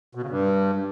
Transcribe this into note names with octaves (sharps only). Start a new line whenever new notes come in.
B2
C#3
G2